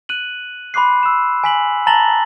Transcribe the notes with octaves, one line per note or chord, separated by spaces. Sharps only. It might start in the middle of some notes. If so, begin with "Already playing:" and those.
F#6 D#7 F#7
B5 C6 D6 F#6 C7
E6 E7
G#5 B6 F#7
A5 A#5 A6 A#6 F#7 G7